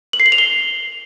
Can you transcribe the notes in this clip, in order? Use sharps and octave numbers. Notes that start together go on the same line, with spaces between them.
F#7
C7
F#7
F7
G7